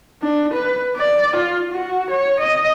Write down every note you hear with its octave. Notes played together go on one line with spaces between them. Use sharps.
D4
B4
D5
F4
F#4
C#5
D#5